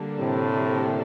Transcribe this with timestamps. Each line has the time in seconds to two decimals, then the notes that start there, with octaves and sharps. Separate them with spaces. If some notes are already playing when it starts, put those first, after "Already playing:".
Already playing: D3 G3 A#3 D4
0.19 A2 C3